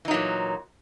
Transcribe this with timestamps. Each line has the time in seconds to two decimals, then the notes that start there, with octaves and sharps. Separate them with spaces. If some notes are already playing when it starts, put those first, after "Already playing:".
0.05 E3
0.08 D#4
0.11 F#3
0.14 A#2